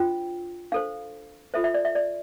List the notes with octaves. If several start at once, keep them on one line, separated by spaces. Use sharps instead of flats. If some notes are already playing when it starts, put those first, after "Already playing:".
Already playing: D4 F4 C5 G5
D4 A4 C5 F5
F4 A4 C5 E5
E5
D5
E5
D5